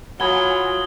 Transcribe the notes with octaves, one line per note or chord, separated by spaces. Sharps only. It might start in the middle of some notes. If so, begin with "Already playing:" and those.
F#3 F4 F#5 G#5 B5 D#6 G#6 G7